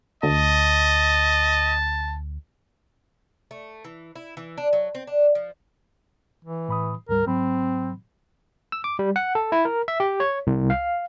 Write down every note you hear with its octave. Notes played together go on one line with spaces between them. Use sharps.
D2 D#5 A5
A3
E3
E4
E3
D4
F#3
C4
D4
F3
E3
A2 B5 D#6
D2 G#2 G3 A#4
G#2 F#3 C4 B5
E6
D6
G3
F#5
A4
E4
A#4
E5
G4
C#5
C2
F5